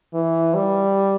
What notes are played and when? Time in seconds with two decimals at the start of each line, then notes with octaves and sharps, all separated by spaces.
0.14 E3
0.55 G3